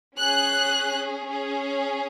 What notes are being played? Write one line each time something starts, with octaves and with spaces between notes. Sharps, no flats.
C#4 G#4 F#6
C#4 G#4